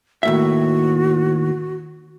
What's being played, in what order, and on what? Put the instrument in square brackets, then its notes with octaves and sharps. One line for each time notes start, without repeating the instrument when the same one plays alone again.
[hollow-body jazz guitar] D#2 A2 E5 [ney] F#4